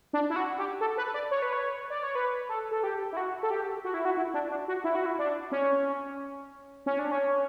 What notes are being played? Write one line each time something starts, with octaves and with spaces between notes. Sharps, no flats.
D4
E4
F#4
G4
A4
B4
D5
C#5
B4
C#5
D5
C#5
B4
A4
A4
G4
E4
F#4
A4
G4
F#4
E4
F#4
E4
D4
D4
F#4
E4
F#4
E4
D4
C#4
C#4
D4
C#4